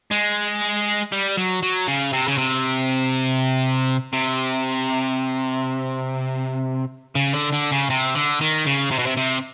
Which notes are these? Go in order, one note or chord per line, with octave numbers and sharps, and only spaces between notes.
G#3
G3
F#3
F#3
C#3
C3
C#3
C3
C3
C#3
D3
D3
C#3
C3
D3
D#3
C#3
C3
B2
C3
C3